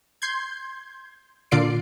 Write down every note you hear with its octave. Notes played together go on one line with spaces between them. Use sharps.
C6 G6 G#6
A#2 D3 F4 D5 C7 D7